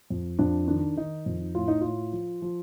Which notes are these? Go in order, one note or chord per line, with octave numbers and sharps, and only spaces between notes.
F2
F2 D4
D#3 D4
D#3 D#4
F2
A2 F4
D#4
A2 F4
F3
F3